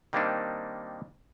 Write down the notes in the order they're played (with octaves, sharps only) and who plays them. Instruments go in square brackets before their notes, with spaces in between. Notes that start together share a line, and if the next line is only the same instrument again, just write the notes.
[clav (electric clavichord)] D#3 G3 A#3 C4 D4 D#4